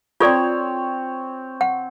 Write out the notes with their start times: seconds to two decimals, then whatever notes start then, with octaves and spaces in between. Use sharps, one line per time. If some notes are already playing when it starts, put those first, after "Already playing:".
0.20 C4 F4 A4 C#5 D5
1.61 F#5